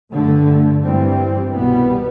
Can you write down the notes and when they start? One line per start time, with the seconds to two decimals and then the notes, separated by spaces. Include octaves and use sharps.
0.12 G2 D3 A3
0.83 G2 E3 G3 C4
1.52 C2 B2 G3 B3